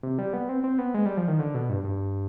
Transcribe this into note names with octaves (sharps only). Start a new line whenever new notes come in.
C3
G3
B3
C4
C4
B3
G#3
G3
F3
D#3
D3
B2
G2
G2